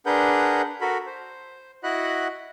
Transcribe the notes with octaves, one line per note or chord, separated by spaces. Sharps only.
D4 G#4 A#4 B4 F#5 G6
F#4 A4 A#4 B5
C5
E4 F#4 D#5 F#5 B5 F#6